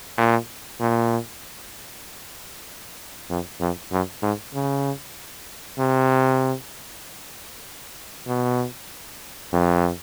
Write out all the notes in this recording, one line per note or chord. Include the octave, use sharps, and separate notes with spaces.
A#2
A#2
F2
F2
F#2
G#2
C#3
C3
B2
F2